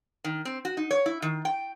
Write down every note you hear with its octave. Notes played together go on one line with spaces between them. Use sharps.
D#3
C4
F#4
D#4
C#5
E4
D#3
G5